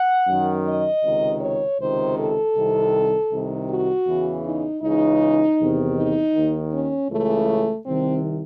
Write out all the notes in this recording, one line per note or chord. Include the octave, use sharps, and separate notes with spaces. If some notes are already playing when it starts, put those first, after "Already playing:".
Already playing: F#5
F#2 D#3
D#5
C#2 C3 D#3
C#5
C#2 C3 D#3 C5
A4
C2 C3 D#3
C2 C3 D#3
F#4
E2 C#3 E3
D#4
C#2 C#3 E3 D#4
E2 C3 D#3
D#4
D#2 D#3
C#4
C#2 C#3 E3 A3
C2 C3 D#3 C4